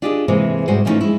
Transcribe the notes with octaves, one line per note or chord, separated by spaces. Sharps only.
D4 F4 G4 G#4 C#5 D#5
C3 E3 G#3 A#3 G#4 C5
G#2 G3 E4 F#4 C5 G#5
E3 F3 G3 A3 C#4 D#4
G#3 E4